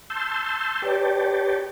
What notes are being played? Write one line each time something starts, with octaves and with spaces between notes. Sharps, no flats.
A5 C6 E6 G6
G4 B4 C#5 D5 G5 A5